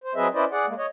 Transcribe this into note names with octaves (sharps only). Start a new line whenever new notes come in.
C5
F#3 C4 G#4 B4 D#5 E5
C#4 E4 B4 C5 D5 D#5
G#4 D5 F#5
G#3 A#3
C#5 D#5